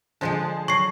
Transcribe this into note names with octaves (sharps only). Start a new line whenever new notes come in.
D3 F3 G#3 G#4 C5 A5
F#3 C#6 C7